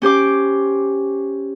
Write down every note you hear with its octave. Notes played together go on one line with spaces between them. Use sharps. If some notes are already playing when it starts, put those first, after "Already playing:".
C#4 G4 C5 D6